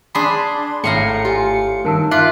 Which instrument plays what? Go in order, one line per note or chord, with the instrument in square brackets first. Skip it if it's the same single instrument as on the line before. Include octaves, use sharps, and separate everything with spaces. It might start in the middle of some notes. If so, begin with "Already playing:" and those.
[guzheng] D4 G#4 [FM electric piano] B5 C6
[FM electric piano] G#1 A3 C#7 [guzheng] A2 F5 A#5
[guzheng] F4 [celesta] G4 G#5
[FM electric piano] G2 D#3 [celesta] A#4 A5 E6
[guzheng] F4 [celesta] E5 F5 B6 [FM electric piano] C6 D6 F#6